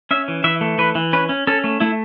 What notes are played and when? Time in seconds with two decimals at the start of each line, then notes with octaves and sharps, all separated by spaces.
0.11 C#4 E5
0.28 E3
0.44 E3 E5
0.61 A3
0.78 E3 B4
0.95 E3
1.13 C#4 B4
1.29 C#4
1.47 C#4 A4
1.64 A3
1.80 A3 E4